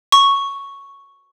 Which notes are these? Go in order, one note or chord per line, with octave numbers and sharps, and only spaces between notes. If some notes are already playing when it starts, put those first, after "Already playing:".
C#6